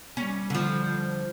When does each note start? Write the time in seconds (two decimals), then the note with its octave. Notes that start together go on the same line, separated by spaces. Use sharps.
0.17 G3 C#4
0.50 D3 F3